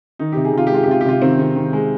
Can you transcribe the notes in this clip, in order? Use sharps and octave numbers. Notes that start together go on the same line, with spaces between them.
D#3 D#4
C3 G4
G#4
C3 F4
G4
G#3 F4
G4
C3 F4
G4
C3 F4
D#3 C4
D#3
D#3
G#3